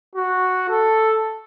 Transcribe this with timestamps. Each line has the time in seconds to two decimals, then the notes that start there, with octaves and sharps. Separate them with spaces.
0.15 F#4
0.69 A4